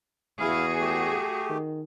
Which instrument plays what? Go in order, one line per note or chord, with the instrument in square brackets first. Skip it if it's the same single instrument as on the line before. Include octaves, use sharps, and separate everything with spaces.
[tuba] E2 [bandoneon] E4 F5 [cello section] F#4 G#4
[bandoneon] A3 G4
[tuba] D#3